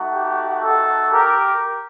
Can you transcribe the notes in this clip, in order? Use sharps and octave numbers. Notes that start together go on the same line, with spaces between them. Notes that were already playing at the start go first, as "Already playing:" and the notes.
Already playing: A3 D#4 F#4
G4
A4
G4 A#4